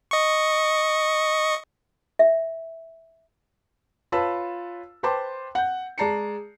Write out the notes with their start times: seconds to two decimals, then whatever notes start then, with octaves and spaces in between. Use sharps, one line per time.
0.11 D#5 C#6
2.19 E5
4.12 F4 B4 C#5 A5 B5 E6
5.03 B4 C5 G5 A5 C6 D6
5.55 F#5 G6
5.98 G#3 D5 A5 A#5 C7 C#7